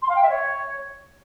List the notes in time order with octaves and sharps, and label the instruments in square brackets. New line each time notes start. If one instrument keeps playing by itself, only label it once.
[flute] C6
F5
G5
E5
C#5